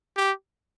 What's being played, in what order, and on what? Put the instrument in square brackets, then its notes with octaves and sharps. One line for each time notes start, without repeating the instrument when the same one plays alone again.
[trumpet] G4